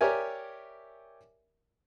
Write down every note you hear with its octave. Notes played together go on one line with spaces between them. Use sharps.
G4 A#4 C#5 D5 E5 G#5